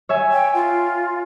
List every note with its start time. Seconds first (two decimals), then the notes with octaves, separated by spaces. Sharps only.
0.09 C#5 E5 G#5
0.32 G5
0.54 F4